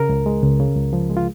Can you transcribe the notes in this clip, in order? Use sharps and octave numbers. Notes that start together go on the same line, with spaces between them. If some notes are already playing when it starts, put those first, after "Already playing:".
Already playing: C#3 A#4
C#2
G#3
C#2
C#3
C#2
F3
G#3
F4